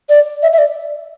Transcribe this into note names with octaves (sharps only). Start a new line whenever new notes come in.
D5
E5
E5
D5